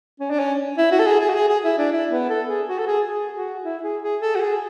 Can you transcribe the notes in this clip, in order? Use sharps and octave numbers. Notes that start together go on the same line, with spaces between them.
C#4
D4
C#4
E4
F#4
A4
G#4
G#4
F#4
G#4
G#4
E4
D4
E4
B3
A4
G#4
F#4
A4
G#4
G#4
F#4
E4
G#4
G#4
A4
F#4
G#4